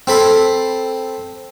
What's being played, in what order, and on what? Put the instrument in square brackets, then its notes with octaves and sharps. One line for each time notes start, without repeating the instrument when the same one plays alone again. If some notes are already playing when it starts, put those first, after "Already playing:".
[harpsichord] C4 A4 B5 C6